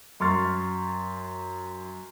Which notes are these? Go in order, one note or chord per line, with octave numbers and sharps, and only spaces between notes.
F#2 C6 C#6 F6 A6